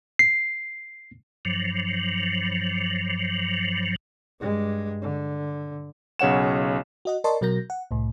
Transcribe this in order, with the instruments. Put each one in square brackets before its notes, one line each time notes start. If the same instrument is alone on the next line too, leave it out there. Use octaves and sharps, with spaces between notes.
[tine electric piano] C7
[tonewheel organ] G2 F3 F#3
[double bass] G2 G#3
D3
[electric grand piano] B1 C#3 C#5 F#5 E7
[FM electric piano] F#4 D#5 F#5
A#4 D5 D#5 A5 C6 C#6
B2 F#3 F#4 A#4 G6 A#6
F#5
C2 A2